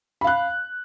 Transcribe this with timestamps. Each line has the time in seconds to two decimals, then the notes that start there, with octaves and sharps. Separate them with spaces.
0.21 B5
0.24 F5
0.27 F#6